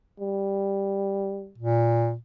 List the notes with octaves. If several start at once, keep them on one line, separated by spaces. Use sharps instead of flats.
G3
A#2